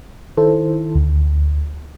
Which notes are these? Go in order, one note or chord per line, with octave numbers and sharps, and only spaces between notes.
D#3 E4 A4 C5
D2